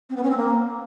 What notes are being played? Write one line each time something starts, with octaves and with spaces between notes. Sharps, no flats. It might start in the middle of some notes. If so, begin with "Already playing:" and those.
C4
B3
C#4
C4
A#3